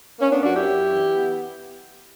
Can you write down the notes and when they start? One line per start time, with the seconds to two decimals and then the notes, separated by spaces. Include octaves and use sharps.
0.19 A#3 C#4
0.31 B3 D4
0.43 F#2 D4 F#4
0.55 E4 G4
0.67 F#2
0.91 E3
1.14 B3